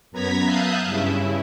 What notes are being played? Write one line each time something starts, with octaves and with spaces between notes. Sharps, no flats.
F#2 B3 A#5 G#6 B6
E5 F5 A5 D#6 F#6 G6
G2 C#3 E4